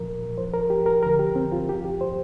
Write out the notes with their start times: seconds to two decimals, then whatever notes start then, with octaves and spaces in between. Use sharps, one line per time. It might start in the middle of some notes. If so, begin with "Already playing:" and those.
Already playing: C2 A#2 F3 A#4
0.37 G2 F3 C5
0.53 A#4
0.70 G4
0.86 A#4
1.03 F2 D3 F3 A#4
1.19 G4
1.36 C4
1.52 F4
1.68 G2 F3 G4
1.85 G4
2.01 C5